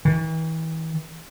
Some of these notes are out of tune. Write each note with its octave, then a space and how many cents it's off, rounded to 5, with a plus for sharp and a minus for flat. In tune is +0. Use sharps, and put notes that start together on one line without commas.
E3 -40